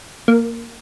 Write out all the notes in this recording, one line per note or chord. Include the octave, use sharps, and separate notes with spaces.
A#3